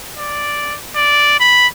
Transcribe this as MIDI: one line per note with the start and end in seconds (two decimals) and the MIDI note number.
0.17 0.76 74
0.96 1.35 74
1.40 1.67 83